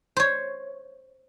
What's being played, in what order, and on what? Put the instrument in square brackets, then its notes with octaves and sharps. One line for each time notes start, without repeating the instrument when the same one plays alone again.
[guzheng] C5 C#5